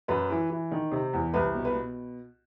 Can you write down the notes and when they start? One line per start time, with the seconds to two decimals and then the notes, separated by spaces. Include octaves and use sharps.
0.08 F#2 B4
0.30 E3
0.50 E3
0.71 D#3
0.92 C3
1.13 E2
1.34 C2 B4
1.54 B2
1.65 B4
1.75 B2